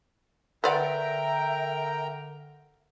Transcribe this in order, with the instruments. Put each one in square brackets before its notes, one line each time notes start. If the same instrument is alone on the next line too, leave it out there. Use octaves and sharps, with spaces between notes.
[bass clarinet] D3 [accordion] A#4 G5 A#5 [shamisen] B4 D5 F#5 [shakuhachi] E5